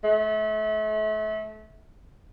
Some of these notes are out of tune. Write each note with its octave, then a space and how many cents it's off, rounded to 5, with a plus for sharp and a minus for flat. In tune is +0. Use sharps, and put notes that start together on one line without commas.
A3 -35